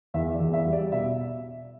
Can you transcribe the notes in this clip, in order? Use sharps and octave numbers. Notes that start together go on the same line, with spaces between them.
E2 E5
D5
E2
E5
G3
D5
B2 E5